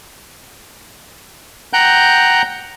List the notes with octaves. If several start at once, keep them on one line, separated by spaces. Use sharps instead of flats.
F#5 G5 A#5 F#6 G6